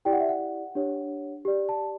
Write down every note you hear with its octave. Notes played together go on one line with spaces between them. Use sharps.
E4 G4 D5 G5
F#5
E5
F#5
D4 G4 C#5
G4 D5
A5